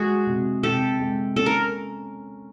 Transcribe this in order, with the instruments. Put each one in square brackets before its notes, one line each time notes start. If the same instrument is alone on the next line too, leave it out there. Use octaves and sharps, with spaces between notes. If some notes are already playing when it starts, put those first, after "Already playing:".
Already playing: [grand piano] G#3 [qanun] F#4 G#4
[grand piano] C3
[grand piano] C3 [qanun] G4 A4
[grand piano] G#3
[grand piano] C#4 [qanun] A4
[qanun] A#4